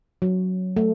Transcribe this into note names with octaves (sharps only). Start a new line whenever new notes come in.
F#3
A3